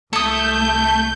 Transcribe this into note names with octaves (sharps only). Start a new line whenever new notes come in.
C2 A3 A4 D#6 G6